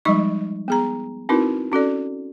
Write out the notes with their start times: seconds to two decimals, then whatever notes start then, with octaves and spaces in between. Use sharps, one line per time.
0.05 F3 G3 G#3 D#4 D#5 C#6
0.68 B3 G#4 A#5
1.29 C4 D#4 E4 F#4 A#4 B4
1.72 C#4 F#4 A4 D5